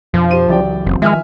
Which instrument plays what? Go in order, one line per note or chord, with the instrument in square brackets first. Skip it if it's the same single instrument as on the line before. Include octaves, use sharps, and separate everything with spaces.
[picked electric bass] F2 B2 [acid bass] F3
[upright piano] G4 C5 D#7
[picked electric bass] C#2 E3 F#3 [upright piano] G4 D5 G5
[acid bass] F#1 [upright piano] C4
[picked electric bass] D#3 F3 [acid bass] G#3 [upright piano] E5 G#5 F6